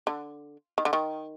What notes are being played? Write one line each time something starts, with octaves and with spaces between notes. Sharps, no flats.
D3
D#3
D3
D#3